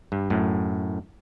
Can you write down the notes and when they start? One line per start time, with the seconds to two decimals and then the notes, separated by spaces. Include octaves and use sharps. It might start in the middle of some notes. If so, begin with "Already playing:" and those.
0.12 G2
0.30 F#2 A2